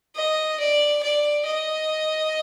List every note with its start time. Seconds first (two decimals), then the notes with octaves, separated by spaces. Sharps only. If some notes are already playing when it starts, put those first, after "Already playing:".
0.16 D#5
0.59 D5
1.03 D5
1.46 D#5